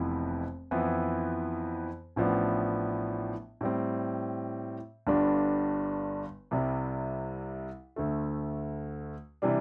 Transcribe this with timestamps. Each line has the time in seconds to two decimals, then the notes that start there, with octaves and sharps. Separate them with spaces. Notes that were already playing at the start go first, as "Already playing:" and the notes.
Already playing: F1 F2 E3 B3 E4
0.71 F2 E3 B3 E4
2.16 A1 A2 F3 B3 D4
3.61 A2 G3 C4
5.07 G1 G2 D3 G3 D4
6.51 C2 C3 G3
7.96 D2 D3 A3
9.42 C3 E3 G3 D4